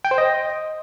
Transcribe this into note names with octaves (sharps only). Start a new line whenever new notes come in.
G5
C5
D#5